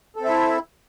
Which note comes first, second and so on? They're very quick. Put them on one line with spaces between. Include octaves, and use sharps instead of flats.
A4 C4 E5 E4